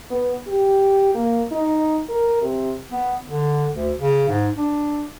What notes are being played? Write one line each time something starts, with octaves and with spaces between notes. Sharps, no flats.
B3
G4
A#3
D#4
A#4
C3
B3
D3
D2
C#3
G#2
D4